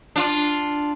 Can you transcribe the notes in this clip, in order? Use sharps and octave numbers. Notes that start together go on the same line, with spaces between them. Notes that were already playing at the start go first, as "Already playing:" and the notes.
D4 F4